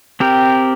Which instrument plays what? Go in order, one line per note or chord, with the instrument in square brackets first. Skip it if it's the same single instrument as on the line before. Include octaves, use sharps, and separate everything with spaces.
[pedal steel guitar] C4 G4 A#4